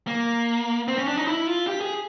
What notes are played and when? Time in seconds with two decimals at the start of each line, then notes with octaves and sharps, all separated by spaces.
0.07 A#3
0.88 C4
0.98 C#4
1.08 D4
1.17 D#4
1.27 E4
1.47 F4
1.67 G4
1.81 G#4